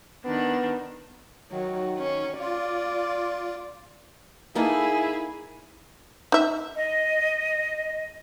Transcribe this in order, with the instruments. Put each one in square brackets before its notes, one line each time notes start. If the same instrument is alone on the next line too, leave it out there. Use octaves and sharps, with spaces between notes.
[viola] D#3 D4 [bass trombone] B3
[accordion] D#3 [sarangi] F#3
[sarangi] C#4
[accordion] F4 [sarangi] D5
[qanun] A#3 D#4 A4 [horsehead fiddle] E4 G#4
[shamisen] D#4 E5
[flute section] D#5